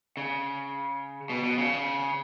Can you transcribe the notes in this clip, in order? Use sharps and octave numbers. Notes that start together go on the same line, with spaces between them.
C#3
B2
B2
C#3